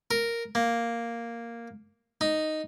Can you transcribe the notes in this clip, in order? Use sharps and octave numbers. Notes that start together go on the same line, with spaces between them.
A#4
A#3
D#4